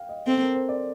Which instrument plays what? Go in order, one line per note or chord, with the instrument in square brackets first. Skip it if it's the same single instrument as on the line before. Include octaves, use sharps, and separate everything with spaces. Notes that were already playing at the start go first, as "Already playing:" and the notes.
Already playing: [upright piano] F5 G5
D#5
[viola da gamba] C4 [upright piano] A4
[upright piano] A#4
C5
D5